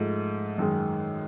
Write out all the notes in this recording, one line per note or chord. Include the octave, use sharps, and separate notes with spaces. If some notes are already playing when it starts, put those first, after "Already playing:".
Already playing: G#2 F3 A3
F#2 D#3 G#3